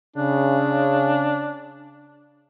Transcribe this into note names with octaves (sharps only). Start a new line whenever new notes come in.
C#3 D4